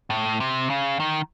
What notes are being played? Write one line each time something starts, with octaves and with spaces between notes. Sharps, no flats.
A2
C3
C#3
D#3